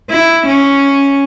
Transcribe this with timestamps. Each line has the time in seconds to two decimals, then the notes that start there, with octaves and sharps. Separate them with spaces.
0.10 E4
0.47 C#4